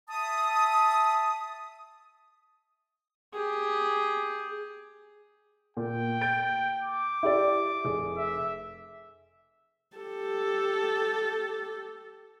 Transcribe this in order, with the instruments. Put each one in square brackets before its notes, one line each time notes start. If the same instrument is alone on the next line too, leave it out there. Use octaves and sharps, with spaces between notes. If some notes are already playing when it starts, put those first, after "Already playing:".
[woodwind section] E5 A5 D#6
[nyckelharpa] G4 G#4
[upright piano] A#2 [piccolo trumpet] G5
[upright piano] G6 A6 D7
[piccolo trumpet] D6
[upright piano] E4 G4 D5
F1 G#4
[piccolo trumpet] E5
[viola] G4 A4